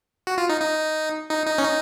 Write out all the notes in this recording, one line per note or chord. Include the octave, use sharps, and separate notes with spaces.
F#4
F4
D#4
D#4
D#4
D#4
C#4
D#4